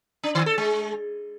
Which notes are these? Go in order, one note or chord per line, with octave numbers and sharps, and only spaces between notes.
D4
D#3
A4
G#3